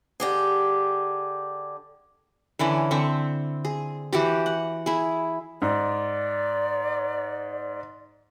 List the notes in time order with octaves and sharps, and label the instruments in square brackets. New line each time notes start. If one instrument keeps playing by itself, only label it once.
[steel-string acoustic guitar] D3 G4 G#4
[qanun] D3 E3 C#4 E4
D3 C4 E5 C#6
G#4
E3 F#4 G4
F#5
E4 G#4
[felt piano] G#2 [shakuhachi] D5